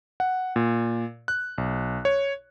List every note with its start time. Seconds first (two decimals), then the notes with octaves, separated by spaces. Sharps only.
0.20 F#5
0.56 A#2
1.28 F#6
1.58 B1
2.05 C#5